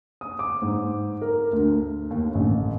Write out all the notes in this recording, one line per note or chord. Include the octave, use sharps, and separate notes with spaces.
D#6
D6
G#2
A#4
D2
D#2
A1